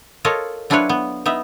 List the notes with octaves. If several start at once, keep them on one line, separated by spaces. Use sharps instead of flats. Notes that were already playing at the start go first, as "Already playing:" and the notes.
F4 A4 A#4 C#5 D#5
F#3 D4 E4 F4 B4 C#5
B3
B3 D#4 E5